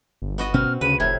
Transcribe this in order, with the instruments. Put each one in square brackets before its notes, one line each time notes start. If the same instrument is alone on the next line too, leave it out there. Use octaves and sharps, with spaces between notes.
[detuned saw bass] G1
[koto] B3 F#4 D#5
[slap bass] B2 C#4 [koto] C4 [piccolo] F6
[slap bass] D2 [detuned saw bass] C#3 [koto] B4 [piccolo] D#7
[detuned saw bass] F1 [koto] A2 C3 [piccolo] G#6